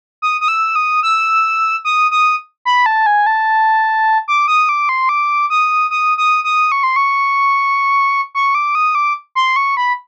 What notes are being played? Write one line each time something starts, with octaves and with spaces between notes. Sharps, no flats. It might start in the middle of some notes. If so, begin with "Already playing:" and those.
D#6
D#6
E6
D#6
E6
D#6
D#6
B5
A5
G#5
A5
D6
D#6
D6
C6
D6
D#6
D#6
D#6
D#6
C#6
C6
C#6
C#6
D6
D#6
D6
C6
C#6
B5